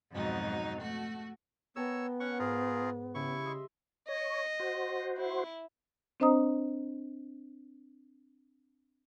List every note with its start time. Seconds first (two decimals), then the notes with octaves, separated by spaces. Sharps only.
0.12 F2 G#2 B2 F#3 D#4
0.79 A3 F#4
1.76 B3 A#4 C#5 G5 A5 E6
2.20 C#4 F#5 C#6
2.39 G#2 F4 G#4 A#4
3.15 C#3 G3 E4 C#6
3.46 D#5 E5 C6
4.08 C#5 D#5
4.60 F#4 C5
5.17 E4
6.20 C4 D4 C5 D#5 A#5 D#6